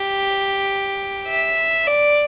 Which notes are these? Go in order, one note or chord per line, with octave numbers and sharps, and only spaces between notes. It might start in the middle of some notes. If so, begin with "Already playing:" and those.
Already playing: G4
E5
D5